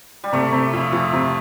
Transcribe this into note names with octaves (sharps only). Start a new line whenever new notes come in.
G3
C3 A3
C3
F2
F2
C3